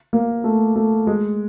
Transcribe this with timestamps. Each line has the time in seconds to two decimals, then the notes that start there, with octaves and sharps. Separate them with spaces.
0.13 A#3
0.44 A3
0.76 A3
1.07 G#3